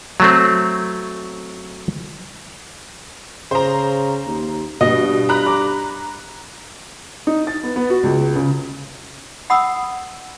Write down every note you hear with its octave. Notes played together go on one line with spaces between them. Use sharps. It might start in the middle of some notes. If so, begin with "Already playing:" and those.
F#3 A3 C4
C#3 C5 A#5
D#2
G2 B2 D#5
A#5 B5 F#6
D6
D#4
A6
B3
B3
F#4
C#2
C#3
F#5 B5 D#6 E6